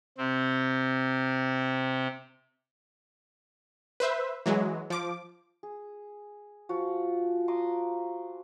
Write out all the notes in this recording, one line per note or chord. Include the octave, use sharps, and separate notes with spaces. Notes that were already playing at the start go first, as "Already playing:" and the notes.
C3 C4
B4 C5 E5
E3 F#3 G#3
F3 D6
G#4
F3 F4 F#4
A#5 C6 D6 D#6